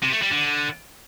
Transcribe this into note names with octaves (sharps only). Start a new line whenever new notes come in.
C3
A3
G3
D3